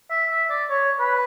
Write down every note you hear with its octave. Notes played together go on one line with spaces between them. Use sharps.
E5
E5
D5
C#5
B4